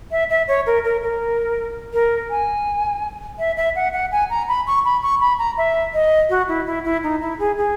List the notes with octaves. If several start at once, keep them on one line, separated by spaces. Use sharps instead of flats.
E5
E5
C#5
A#4
A#4
A#4
A#4
G#5
E5
E5
F#5
F#5
G#5
A#5
B5
C#6
B5
C#6
B5
A#5
E5
D#5
F#4
E4
E4
E4
D#4
E4
G#4
G#4